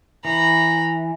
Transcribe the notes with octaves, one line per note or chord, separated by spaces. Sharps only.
E3 A#5 B5